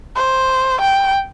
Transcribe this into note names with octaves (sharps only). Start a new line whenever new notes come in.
C5
G5